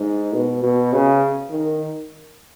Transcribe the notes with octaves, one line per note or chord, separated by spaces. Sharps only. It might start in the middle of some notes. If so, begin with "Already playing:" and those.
Already playing: G#2
B2
B2
C#3
D#3